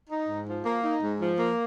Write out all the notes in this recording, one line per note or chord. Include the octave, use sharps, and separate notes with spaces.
D#4
G#2
F3
A#3
D#4
G#2
F3
A#3